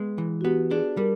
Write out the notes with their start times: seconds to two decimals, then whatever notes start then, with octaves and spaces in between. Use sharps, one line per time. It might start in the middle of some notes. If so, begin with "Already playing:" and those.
Already playing: G#3 B3
0.18 E3
0.41 F#4
0.44 B3 G4
0.71 D4 G#4
0.97 G3 A#4